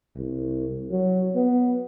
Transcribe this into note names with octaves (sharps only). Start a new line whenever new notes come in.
C2
F#3
B3